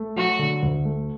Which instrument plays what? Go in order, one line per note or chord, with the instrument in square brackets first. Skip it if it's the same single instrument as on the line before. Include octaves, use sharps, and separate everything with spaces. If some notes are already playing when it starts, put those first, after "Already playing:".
Already playing: [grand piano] A3
[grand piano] F#3 [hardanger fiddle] F#4
[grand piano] D3
D2
A3